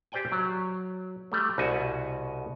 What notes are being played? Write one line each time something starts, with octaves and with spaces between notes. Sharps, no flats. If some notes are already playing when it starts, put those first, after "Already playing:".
G4 C5 D5 G5 G#5
F#3
G3 A3
C2 B2 F#4 G#5